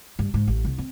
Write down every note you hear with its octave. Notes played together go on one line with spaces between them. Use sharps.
G2
G#2
A1
C2
C4